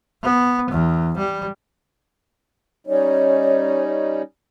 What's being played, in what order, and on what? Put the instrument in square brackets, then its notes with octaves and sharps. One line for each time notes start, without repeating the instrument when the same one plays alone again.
[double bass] B3
E2
G3
[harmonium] G3 C#4 D#4 [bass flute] C#5